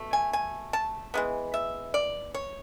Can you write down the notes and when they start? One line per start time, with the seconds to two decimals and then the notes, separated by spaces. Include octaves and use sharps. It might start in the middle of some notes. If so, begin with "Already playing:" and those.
Already playing: B2 A3
0.13 G#5
0.33 G#5
0.73 A5
1.14 E3 G#3 B3
1.54 E5
1.94 D5
2.34 C#5